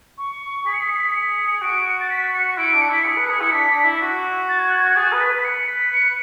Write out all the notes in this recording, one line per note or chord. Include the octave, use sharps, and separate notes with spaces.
C#6
G#4 B6
C#7
B6
C#7
B6
C#7
F#4 D7
C#7
A6
B6
C#7
E4 D7
D4
C#7
E4 B6
G#4 C#7
B4
G#4
E4 C#7
D4 B6
D4
E4
F#4
A6
G#6
F#6
G#6
G#4 A6
B4
B6
B4
B6
C#7
B6
C#7